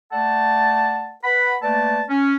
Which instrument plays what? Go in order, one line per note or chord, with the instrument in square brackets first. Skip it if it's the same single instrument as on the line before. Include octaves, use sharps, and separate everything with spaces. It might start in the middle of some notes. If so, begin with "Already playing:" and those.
[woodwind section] A3 D5 F#5 A5
B4 F#5 B5
A3 A#3 B4 D5 A5
C#4